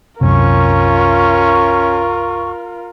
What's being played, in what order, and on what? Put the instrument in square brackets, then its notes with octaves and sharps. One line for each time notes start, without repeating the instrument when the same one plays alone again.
[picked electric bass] C2 F#2 C3 [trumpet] C#4 [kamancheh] F4 A#4 [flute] C#6